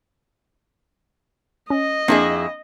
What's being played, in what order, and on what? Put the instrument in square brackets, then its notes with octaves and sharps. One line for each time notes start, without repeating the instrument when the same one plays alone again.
[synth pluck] C#4 [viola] D#5
[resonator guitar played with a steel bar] F2 E4 G#4 [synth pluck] A#3 C4 D4